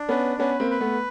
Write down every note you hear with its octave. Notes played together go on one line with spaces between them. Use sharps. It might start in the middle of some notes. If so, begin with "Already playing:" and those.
Already playing: D4
B3 C#4 B4
B3 C#4 B4
A#3 C4
B4
A3 B3